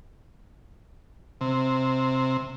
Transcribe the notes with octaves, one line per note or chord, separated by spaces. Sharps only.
C3